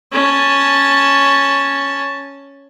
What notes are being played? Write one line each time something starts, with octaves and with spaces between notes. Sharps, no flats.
C#4 A5